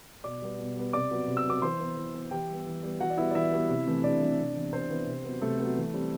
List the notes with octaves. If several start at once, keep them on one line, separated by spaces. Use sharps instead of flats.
B2 D5 D6
G3 B3
B2
G3 B3
C3 D5 D6
F#3 B3
C3
E6
F#3 B3 D6
E3 C5 C6
B3
E3
B3
E3 G4 G5
G3 B3
E3
G3 B3
E3 F#4 F#5
D5
G3 B3 E4 E5
D5
E3 E4 E5
G3 B3
C3
E3 A3 C4
C3 D4 D5
E3 A3 C4
C3
E3 B3
C3 C4 C5
E3 B3
C3
F#3 B3
C3 A3 A4
F#3 B3
E3
G3 C4